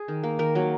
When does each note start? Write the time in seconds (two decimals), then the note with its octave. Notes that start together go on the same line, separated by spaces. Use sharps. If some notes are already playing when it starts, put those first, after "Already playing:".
Already playing: G#4
0.08 D#3
0.23 A#3
0.39 D#3 A#4
0.55 F#3 A#3